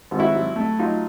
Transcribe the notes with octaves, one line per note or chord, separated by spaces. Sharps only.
G#1
E4 F#4
F#3
A3
F#3 D#4 F4